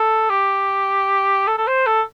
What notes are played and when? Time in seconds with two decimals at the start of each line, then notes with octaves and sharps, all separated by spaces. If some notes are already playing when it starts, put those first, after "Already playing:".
Already playing: A4
0.30 G4
1.47 A4
1.57 A4
1.67 C5
1.86 A4